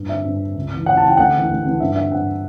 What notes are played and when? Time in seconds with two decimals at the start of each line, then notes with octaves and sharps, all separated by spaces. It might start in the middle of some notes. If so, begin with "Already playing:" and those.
Already playing: G2
0.09 D3 E5
0.25 G2
0.40 D3
0.56 C#2
0.71 C#3 E3
0.86 C#2 F#5
0.97 A5
1.02 C#3 E3
1.08 G5
1.17 D2 F#5
1.34 C#3 E3
1.49 D2
1.65 C#3 E3
1.80 G2 E5
1.96 D3 E5
2.11 G2 F#5
2.27 D3